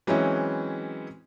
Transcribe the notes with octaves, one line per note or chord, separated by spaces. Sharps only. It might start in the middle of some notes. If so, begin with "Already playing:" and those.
E3 F#3 G#3 C4 C#4 E4